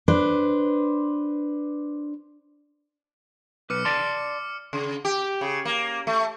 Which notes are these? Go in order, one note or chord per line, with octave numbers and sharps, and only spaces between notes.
D4 B4 C5
B1 B4 D6 F6 C#7
D5 A5 C6
C#3
G4
C#3
A#3
A3